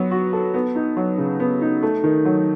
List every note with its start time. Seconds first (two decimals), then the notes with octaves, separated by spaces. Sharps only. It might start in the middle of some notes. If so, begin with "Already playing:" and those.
Already playing: F#3 B3
0.11 F#4
0.33 A4
0.54 B3
0.76 D#4
0.97 F#3
1.18 C#3
1.40 B3
1.62 D#4
1.83 A3
2.04 D#3
2.25 F#3